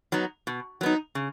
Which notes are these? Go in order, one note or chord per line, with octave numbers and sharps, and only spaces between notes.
F#3 B3 D#4
B2
F#3 B3 D#4
C#3